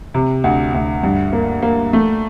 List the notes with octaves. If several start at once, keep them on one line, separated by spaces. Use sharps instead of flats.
C3
D2
D2
G2
A#3
A#3
A3